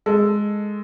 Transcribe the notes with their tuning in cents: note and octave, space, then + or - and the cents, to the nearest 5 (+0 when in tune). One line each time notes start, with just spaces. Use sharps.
G#3 +0 A4 +0